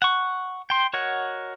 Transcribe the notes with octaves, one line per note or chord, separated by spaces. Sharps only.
F#5 C#6
G5 C6
F#4 A#4 C#5 D#5 F#5